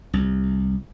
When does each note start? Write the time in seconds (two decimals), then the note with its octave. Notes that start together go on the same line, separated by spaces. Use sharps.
0.13 C2